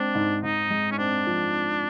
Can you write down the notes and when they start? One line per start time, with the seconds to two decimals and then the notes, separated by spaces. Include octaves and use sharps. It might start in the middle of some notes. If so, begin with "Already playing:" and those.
Already playing: G#3 C4 D4
0.15 G#2
0.43 G#2 D#4
0.70 G#3
0.91 C#4
0.98 C4 D4
1.27 F3